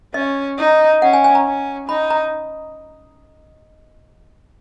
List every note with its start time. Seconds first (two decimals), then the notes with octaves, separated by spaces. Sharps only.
0.14 C#4 D#5
0.58 D#4
1.02 C#4 F#5
1.13 G#5
1.24 G#5
1.35 A#5
1.46 C#4
1.89 D#4 B5
2.10 A#5